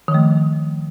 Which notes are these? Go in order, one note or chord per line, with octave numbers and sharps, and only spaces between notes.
D#3 F3 A3